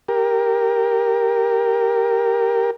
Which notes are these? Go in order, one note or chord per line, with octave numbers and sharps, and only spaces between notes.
G4 A#4